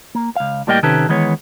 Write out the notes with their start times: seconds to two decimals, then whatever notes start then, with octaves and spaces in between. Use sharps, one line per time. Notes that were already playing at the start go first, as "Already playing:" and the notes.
0.15 A#3
0.36 C#2 F5
0.67 A2 G3 A#3 D#5 F5 G5
0.83 C3 D#3 C#4 G4 A4 B4
1.09 D#3 E3 G#3 B3 C#5